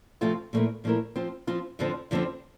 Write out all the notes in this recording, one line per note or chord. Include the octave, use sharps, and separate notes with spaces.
C3 F3 A3 C4 F4
A#2 F3 A3 E4 A#4
A#2 F3 A3 E4 A#4
F3 C4 F4
F3 C4 F4
F2 D3 F3 C4
F2 D3 F3 C4